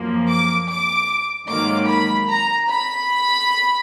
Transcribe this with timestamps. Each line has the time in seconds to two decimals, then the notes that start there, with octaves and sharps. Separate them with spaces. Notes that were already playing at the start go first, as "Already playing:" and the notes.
Already playing: F#2 F3 A#3
0.30 D6
0.69 D6
1.48 G#2 D#3 F#3 A#3 D6
1.88 B5
2.28 A#5
2.68 B5